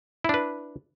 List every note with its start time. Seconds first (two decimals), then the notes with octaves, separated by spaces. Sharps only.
0.24 E4
0.29 D4
0.34 B4